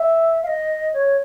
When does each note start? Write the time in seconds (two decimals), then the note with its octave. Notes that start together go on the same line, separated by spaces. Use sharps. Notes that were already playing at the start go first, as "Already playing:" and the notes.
Already playing: E5
0.43 F5
0.47 D#5
0.93 C#5